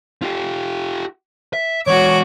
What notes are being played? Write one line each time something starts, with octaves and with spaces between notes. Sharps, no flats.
F4 G4
E5
E3 G#3 F#4 C#5 D6